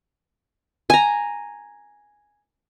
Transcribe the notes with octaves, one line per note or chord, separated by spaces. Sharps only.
G#5 A#5